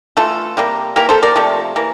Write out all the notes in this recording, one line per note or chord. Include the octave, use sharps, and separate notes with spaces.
E3 A3 F4 A4
C3 G3 A#3
E3 A#3 G4 A#4
A4 C5
A#4 D5
C3 F3 A3
E3 A#3